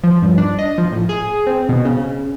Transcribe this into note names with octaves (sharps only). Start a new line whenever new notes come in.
F3
G2
D4
D#5
F3
A2
G#4
C4
B2
C#3
C#3